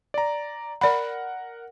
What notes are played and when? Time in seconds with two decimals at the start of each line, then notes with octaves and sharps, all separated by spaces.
0.14 D5 A#5
0.81 A#4 D5 F#5 B5